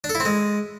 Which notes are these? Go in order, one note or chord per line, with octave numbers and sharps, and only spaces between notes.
D4
A4
E4
C4
G#3